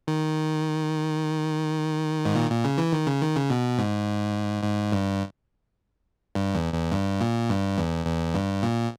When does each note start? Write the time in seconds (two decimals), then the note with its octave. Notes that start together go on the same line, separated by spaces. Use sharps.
0.08 D#3
2.25 G#2
2.35 A#2
2.50 A#2
2.65 C#3
2.78 E3
2.93 D#3
3.07 C#3
3.21 D#3
3.35 C#3
3.50 B2
3.78 G#2
4.63 G#2
4.92 G2
6.35 G2
6.54 E2
6.73 E2
6.91 G2
7.20 A#2
7.50 G2
7.78 E2
8.06 E2
8.35 G2
8.63 A#2